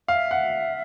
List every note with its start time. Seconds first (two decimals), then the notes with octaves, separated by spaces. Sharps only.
0.08 E5 F5
0.31 F#5